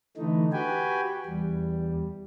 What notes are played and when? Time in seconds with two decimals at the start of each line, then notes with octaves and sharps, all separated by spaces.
0.17 D3 E3 A3 D#4
0.53 F#4 G4 B4 G5 G#5
1.26 E2 G3